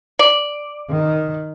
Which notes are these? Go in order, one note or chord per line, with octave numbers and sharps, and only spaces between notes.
D5
D#3